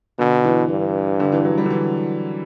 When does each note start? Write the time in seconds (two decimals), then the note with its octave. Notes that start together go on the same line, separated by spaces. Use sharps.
0.19 B2 D3
0.44 E3
0.70 G2
1.20 D3
1.32 E3
1.45 F#3
1.58 G3
1.66 D3
1.70 E3